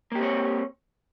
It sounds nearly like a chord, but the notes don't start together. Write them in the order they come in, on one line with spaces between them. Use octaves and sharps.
A#3 G4 C4 C#5